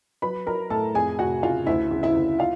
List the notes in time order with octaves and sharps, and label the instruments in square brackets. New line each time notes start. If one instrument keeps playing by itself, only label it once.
[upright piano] F#3 B4 B5
F#3 A#4 A#5
A2 A4 A5
F2 G#4 G#5
F1 F#4 F#5
C#3 F4 F5
D2 E4 E5
C#3
E4 E5
D2
F4 F5